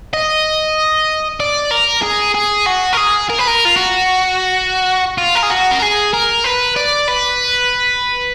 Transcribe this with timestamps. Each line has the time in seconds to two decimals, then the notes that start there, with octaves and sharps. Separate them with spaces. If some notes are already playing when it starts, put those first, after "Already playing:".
0.14 D#5
1.40 D5
1.71 A#4
2.03 G#4
2.35 G#4
2.66 F#4
2.93 A#4
2.97 G#4
3.30 A#4
3.38 B4
3.47 A#4
3.65 F4
3.76 F#4
5.18 F4
5.35 A#4
5.43 G#4
5.50 F#4
5.71 A#4
5.82 G#4
6.14 A#4
6.44 B4
6.77 D5
7.08 B4